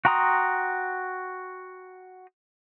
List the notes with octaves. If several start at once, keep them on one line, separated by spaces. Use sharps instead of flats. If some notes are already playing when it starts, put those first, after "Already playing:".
F#4 G5 A#5 C6 D#6